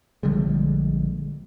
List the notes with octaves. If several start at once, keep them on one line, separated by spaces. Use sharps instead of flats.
A#1 D3 G3 G#3